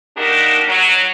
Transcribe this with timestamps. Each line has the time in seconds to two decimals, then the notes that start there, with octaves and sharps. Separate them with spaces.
0.17 A#3 D4 D#4 F#4 G4 A#4
0.69 F#3